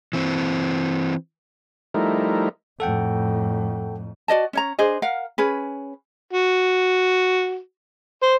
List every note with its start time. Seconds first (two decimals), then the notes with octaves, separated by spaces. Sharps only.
0.13 E3 C4
1.94 F3 G3 A3 D#4 E4 A#4
2.80 F2 A2 A4 F#5 G5
4.28 F#4 D5 D#5 A5
4.53 C#4 C#5 A#5
4.79 D4 G#4 C5 D#5
5.02 A#4 F5 F#5
5.38 C#4 G#4 B4
6.33 F#4
8.23 C5